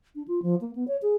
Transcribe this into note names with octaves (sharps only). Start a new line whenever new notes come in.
D4
F4
F3
A#3
B3
C#5
G#4